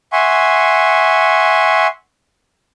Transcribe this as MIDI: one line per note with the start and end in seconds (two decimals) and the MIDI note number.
0.13 1.87 76
0.13 1.87 78
0.13 1.87 80
0.13 1.87 84
0.13 1.87 85